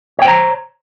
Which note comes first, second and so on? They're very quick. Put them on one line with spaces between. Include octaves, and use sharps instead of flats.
C#5 G5 C5 A#5